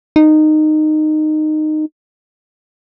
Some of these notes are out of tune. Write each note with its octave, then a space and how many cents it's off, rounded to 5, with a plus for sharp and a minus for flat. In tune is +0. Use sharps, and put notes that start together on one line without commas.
D#4 -15